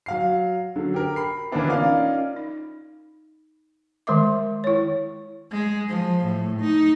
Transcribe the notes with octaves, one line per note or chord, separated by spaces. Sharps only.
F#3 F5 C7
D3 F#3
G4 A#4
B5 C7
E3 A#3 B3 C#4 D4 E4
C#4 D#4 F4 A#4 D5 F5
D#4
D#3 G#3 A#4 E5 D6
E4 C#5
G#3
F3
A2
D#4